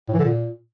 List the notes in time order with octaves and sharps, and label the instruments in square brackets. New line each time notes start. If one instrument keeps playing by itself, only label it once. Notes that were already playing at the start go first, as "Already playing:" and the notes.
[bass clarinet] A2
E3
D3
A#2